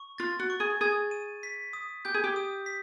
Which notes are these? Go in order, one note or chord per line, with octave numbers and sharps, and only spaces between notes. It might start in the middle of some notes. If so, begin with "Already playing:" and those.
Already playing: C#6
F4 A6
F#4
C#6
G#4
G#4 G#6
D#7
B6
D#6
G4 G6
G#4
G4
D#6
B6